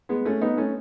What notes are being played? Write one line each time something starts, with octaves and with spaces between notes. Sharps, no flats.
G#3 B3
A3 C#4
B3 D#4
A3 C#4